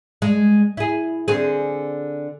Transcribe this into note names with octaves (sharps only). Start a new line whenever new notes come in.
G#3
E4 G#4
D3 C4 G#4